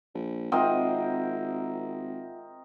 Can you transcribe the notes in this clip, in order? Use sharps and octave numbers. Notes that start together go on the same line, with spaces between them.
A#1
G#1 C4 F4 A#4 D#5 E5 F#5